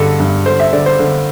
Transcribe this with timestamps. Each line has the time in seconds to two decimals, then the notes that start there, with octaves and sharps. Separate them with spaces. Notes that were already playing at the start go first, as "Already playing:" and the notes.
Already playing: G2 D3 A4
0.20 G2
0.46 D3 C5
0.59 E5
0.73 D3 D5
0.86 C5
0.99 D3